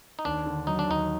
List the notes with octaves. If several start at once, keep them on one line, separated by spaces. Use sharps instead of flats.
D#4
D#2 D4
D3
F#3 D#4
D4
D#2 D#4